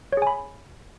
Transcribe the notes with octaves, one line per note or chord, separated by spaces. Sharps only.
G#4 C#5 G#5 B5